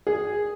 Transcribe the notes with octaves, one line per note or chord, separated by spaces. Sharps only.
G#4